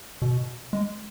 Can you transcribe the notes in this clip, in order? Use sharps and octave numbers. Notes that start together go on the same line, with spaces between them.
B2
G#3